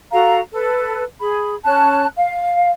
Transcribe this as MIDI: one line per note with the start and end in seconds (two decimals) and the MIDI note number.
0.12 0.40 66
0.12 0.40 69
0.12 0.40 77
0.12 0.40 82
0.53 1.03 69
0.53 1.03 71
1.19 1.55 68
1.19 1.55 83
1.64 2.06 61
1.64 2.06 81
1.64 2.06 90
2.17 2.70 77